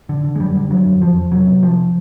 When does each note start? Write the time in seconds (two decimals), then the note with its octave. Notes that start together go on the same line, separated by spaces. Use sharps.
0.09 D3
0.25 D3
0.35 G#3
0.40 F#2 G3
0.55 D3
0.70 D3 F#3
0.86 F#2
1.01 F2 F3
1.16 F2
1.32 C3 F#3
1.47 C3
1.63 C3 F3